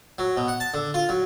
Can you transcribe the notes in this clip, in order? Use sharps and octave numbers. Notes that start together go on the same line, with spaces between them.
F#3
B2
F#5
A5
D3
F4
F#3